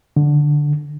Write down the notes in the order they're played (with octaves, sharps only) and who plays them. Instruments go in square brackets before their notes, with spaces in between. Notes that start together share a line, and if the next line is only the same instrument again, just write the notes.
[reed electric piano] D3